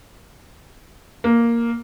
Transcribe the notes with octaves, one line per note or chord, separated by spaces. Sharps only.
A#3